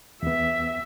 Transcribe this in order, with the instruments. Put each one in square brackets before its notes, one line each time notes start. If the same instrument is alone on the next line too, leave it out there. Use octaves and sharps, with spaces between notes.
[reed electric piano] E2 B3 [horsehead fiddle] E5